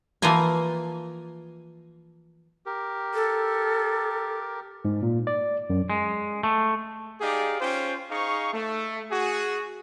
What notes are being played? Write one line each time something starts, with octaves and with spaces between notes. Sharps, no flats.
E3 F3 A#3 F4 G#5
G4 A#4
A4
G#2
A#2
D5
F#2
G#3
A3
D#4 G4 G#4 D5 F5
C#4 F4 C5 G5
D#4 G#4 F5 C#6
A3
F#4 G#4